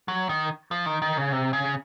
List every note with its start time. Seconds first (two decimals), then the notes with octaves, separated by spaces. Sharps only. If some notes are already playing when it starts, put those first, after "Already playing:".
0.08 F#3
0.29 D#3
0.71 F3
0.86 D#3
1.02 D#3
1.17 C#3
1.33 C3
1.53 C#3